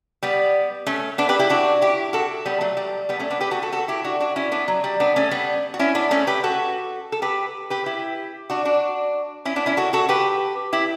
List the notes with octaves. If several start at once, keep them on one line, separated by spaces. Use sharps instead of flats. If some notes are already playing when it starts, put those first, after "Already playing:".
G3 B3
A3 C#4
B3 D4
G4 B4
E4 G4
D4 F#4
E4 G4
F#4 A4
G3 B3
F#3 A3
G3
G3 B3
A3 C#4
B3 D4
G4 B4
F#4 A4
F#4 A4
F#4 A4
E4 G4
D4 F#4
D4 F#4
C#4 E4
B3 D4
F#3
G3
B3 D4
A3 C#4
G3 B3
F#4
C#4 E4
B3 D4
A3 C#4
G4 B4
F#4 A4
A4
G4 B4
G4 B4
E4 G4
D4 F#4
D4 F#4
C#4 E4
B3 D4
C#4 E4
F#4 A4
F#4 A4
G4 B4
E4 G4